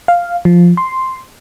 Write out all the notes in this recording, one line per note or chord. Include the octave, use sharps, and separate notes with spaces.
F5
F3
C6